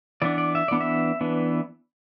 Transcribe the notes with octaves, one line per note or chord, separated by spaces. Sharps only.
E3 B3 D4 D5
D5
E5
E3 B3 D4 D5
E5
E3 B3 D4